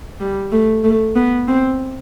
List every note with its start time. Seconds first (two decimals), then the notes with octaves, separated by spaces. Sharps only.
0.20 G3
0.52 A3
0.84 A3
1.16 B3
1.48 C4